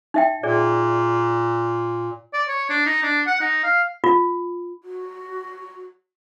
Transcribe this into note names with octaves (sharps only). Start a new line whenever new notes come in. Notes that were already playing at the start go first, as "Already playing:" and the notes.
D#4 E5 G5
A#2 G#4 D5
D5
C#5
D4
D#4
D4
F#5
D#4
F5
F4
F#4